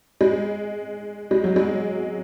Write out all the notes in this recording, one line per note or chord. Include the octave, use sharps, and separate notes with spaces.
G#3
G#3
F#3
G#3